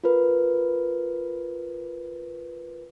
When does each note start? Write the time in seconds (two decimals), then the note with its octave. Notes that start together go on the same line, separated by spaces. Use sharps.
0.04 F4 A#4 B4